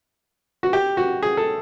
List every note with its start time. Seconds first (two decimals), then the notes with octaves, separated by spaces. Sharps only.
0.63 F#4
0.73 G4
0.97 F#4
1.23 G#4
1.37 A4